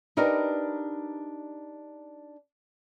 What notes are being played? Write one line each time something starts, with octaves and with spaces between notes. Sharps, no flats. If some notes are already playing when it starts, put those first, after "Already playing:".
D4 D#4 G4 A#4 B4 D5